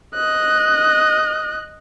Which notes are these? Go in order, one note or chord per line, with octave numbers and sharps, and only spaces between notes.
D#5 F#6